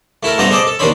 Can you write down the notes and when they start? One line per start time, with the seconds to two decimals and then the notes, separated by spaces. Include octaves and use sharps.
0.23 A3 E4 A4 A#4
0.38 G2 A3 B3 C5 D#5 A#5
0.51 G#4 A4 C5 D5 D#5
0.67 A4
0.79 D#2 D#3 D4 C5 C#5 B5